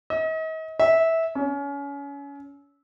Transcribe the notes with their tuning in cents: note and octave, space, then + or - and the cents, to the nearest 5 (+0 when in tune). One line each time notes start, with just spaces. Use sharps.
D#5 +40
E5 -15
C#4 +30